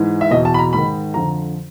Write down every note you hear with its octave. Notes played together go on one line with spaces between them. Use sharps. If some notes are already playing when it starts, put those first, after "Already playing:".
Already playing: G#2 E3
E5
E2 B2 D#5
A5
B5
A#5
G#2 D#3 B5
F2 D3 A#5